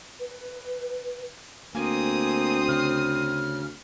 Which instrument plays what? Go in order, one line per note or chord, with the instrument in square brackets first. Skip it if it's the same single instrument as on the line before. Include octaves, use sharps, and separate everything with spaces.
[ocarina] B4
[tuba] D2 [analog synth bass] A#3 [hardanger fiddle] C4 D#6 [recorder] G#5
[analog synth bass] C#3 [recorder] F6